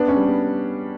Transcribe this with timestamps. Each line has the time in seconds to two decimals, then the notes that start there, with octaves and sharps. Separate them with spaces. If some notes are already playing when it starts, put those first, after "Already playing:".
Already playing: B3 D4
0.08 C#4
0.17 G3
0.26 B3